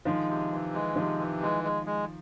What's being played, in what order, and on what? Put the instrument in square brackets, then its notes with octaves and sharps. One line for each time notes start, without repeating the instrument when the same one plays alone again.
[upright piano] D#3 F3 [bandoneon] G#3
[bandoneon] C3
E3
G#3
[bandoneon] C3 [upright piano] D#3 F3
[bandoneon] E3
G#3
G#3
G#3